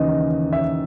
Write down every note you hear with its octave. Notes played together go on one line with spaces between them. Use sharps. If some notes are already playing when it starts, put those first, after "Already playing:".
Already playing: D#2 C#3 E3 D#5
E5